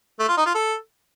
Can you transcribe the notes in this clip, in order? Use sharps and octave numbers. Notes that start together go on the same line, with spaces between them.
A3
F4
D#4
F4
A4